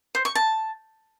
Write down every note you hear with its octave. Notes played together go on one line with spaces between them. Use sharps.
C5
C#6
A5